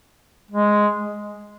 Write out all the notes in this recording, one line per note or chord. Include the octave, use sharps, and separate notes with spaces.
G#3